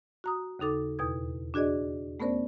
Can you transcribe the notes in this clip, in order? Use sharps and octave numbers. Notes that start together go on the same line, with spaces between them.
F#4 A#5 D#6
D#2 C#3 D#4 A4 D6
E2 B2 D#6 G#6
D4 F#4 G#4 D5 D#5
A3 B3 C#4 A#4 C5 D5